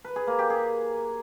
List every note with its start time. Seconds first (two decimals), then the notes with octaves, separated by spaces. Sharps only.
0.05 B4
0.16 G#4
0.27 A#3
0.39 G4
0.50 G#4